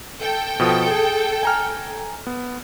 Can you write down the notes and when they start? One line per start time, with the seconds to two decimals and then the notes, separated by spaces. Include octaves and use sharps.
0.19 A4 G5
0.60 B2 F3 D#6
0.91 G#4
1.43 G#5 A#5 F6
2.27 B3